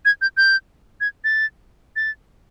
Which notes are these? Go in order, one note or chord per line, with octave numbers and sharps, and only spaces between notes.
G#6
G6
G6
G#6
A6
A6